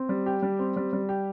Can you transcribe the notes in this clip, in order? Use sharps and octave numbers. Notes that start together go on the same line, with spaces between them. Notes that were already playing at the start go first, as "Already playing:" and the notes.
Already playing: C4
G3
G4
G3
C4
G3
G3
G4